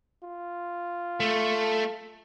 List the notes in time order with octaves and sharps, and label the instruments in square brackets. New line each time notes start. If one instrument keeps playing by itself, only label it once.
[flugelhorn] F4
[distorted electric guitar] A3